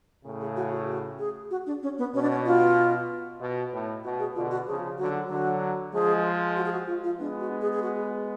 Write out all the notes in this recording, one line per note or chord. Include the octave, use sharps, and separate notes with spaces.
A2 C#3
G#4
F#4
F#4
F#4
G#4
F#4
D4
C#4
B3
B2 C#4
D4
C#4
F4
B2
A2
B2 F#4
G#4
B2 D3 F4
F#4
C#3 F3 G#4
D3 F#3 F#4
D3 F#3 F#4
F3 G#3 G#4
F#4
G#4
F#4
F4
F4
G#3 B3 D4
F#4
G#4
G#4
F#4